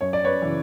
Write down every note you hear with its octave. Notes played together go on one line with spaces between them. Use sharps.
F#2 C#5
D5
B4 C#5
C#3 E3